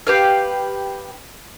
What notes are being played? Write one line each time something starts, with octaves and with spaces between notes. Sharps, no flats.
G4 B4 F5